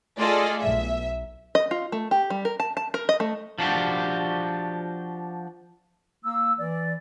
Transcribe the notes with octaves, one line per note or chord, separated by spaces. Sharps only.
A3 F4 G#4 A4 D5 D#5
B1 E5
D#5
F4
A3
G4
G3
A#4
A5
A5
A#4
D#5
A3
F3 D4 F#4 G4
A#3 E6
E3 D5